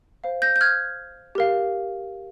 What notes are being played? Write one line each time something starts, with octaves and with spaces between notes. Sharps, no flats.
C5 F5
G6 A#6
G6
F6 G#6
G4 A#4 F5